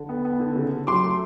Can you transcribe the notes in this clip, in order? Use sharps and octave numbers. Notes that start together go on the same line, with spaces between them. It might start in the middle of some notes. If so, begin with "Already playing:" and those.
Already playing: D3
B3
B3
D3
C#3
C#3
F#3 C6 D6
A3